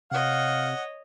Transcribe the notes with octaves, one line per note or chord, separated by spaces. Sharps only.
C3 C#5 D#5 F5 F#5